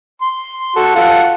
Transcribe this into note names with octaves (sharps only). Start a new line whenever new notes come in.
C6
F#4 A4
F4 A4 F#5